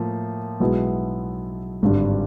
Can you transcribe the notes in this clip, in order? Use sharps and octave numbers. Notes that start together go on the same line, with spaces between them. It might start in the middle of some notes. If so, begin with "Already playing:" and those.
Already playing: A2 F3 A#3
B1 B2 G#3 B3 E4
G#1 G2 D3 G3